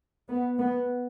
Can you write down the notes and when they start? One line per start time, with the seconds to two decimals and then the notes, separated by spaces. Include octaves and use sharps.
0.29 B3
0.59 B3